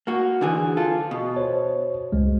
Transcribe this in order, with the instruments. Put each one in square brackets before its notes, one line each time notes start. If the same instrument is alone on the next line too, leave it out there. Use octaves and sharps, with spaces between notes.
[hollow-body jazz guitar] A#3 F#4
D3 E3 G#4
F4 A4
B2
[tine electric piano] C5 C#5
C#2 G#3